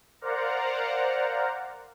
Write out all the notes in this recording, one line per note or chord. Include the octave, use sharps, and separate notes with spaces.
A#4 C5 D5 F5 F#5 A#5